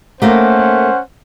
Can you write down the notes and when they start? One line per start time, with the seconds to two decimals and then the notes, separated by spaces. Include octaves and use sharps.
0.22 A3 A#3 C#4 A#4 C5 F#5